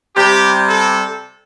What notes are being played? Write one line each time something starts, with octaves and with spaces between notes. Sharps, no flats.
C3 G3 G4
A4